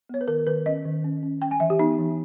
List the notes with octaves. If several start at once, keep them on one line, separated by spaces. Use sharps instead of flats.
B3 C#5
B4
D#3 A#4
D#3 B4
C#4 D#5
D#3
C#4
C#4
C#4 G5
G#5
E3 E5
G4
B3 D#4
E3